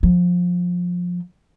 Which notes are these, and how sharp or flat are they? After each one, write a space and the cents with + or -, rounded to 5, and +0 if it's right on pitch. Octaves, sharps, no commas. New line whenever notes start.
F3 +20